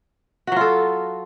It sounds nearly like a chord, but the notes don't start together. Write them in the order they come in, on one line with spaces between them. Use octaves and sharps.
F#4 F#3 F4 A4